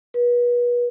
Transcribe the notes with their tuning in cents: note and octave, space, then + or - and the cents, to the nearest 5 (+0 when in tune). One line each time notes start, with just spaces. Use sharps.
B4 -35